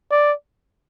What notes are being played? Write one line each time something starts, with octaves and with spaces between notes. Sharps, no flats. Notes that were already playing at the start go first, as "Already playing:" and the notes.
D5